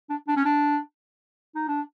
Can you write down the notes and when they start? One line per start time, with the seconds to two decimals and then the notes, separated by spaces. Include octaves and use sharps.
0.10 D4
0.28 D4
0.37 C#4
0.45 D4
1.55 D#4
1.68 D4